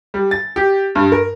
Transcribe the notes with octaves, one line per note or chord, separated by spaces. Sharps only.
G3
A6
G4
G2
A#4